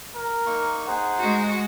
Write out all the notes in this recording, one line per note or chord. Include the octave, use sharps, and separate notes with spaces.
A#4
A#3 D#4 C#6
D#4 G#4 C5 F#5
G#3 F#4